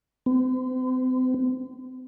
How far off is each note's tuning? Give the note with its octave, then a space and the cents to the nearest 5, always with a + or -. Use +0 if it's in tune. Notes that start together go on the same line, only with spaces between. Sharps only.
C4 -40